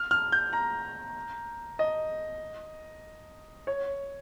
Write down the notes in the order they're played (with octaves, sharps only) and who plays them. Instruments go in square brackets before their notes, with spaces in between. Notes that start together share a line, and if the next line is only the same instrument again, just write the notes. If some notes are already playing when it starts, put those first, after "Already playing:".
Already playing: [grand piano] F6
F6
G6
A#5
D#5
C#5